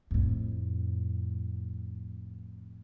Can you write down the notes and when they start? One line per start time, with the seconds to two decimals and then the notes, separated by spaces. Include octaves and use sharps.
0.11 F2 A2